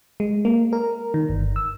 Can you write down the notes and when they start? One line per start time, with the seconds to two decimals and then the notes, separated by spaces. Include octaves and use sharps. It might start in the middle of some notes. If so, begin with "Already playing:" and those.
0.20 G#3
0.45 A#3
0.73 A#4
1.14 D#3
1.29 G1
1.56 E6